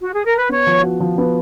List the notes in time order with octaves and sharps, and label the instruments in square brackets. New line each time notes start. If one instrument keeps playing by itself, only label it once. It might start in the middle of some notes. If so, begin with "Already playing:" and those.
[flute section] F#4
G#4
A#4
B4
[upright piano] B3 [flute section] C#5
[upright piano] F3
F#4
F3
B3